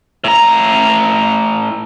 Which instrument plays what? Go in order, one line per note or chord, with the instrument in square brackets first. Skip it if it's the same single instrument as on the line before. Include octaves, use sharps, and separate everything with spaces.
[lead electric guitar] A2 A#5